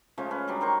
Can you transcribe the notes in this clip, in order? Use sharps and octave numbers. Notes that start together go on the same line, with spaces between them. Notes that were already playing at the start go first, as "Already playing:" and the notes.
C#3 F3 G#3 A3
C#4 B4
F#3 G3 D4
D#3 A#4 C5 C#6